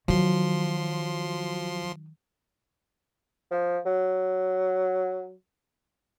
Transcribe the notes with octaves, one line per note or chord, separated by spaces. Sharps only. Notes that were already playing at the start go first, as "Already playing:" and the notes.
D#3 F3 F#3 C6
F3
F#3